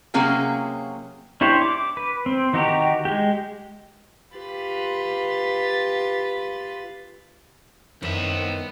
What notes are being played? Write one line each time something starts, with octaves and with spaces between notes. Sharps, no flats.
C3 F#3 A#3 C#4 F4 G#4
D4 E4 G4 C5 C#5
D6
B4
C4
D#3 D#4 F#4 G4 A#5
G#3 G4
F4 G4 B4 A6
C2 F#2 D#3 B3 E5